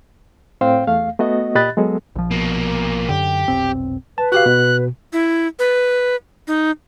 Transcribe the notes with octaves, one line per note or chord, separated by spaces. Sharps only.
A2 C4 C5 F5 G5
E2 A3 F5
A3 B3 F#4 D#5
A#2 G4 D#5 B5 F#6 A6
F#3 G#3 B3 A4
A#1 F3
B2 A#3
F#2 D3 G4
F1 B1 C4
B4 A5
F#4 G4 F5 F#6
B2
E4
B4
D#4